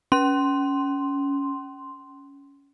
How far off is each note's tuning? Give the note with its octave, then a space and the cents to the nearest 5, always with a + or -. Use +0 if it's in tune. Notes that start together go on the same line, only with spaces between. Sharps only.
C#4 +15 C6 +0